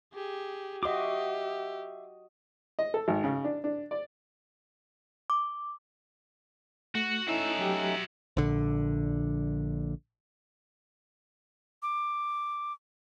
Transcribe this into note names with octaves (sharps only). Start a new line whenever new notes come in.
G4 G#4
F#4 G4 D#5 E5 C6 D6
D#5
A4
G#1
C#3
D4
D4
D5
D6
A3 F#4
A3 C#4 D#4 E4 F#4 E5
F#3 G4
A#1 D3
D6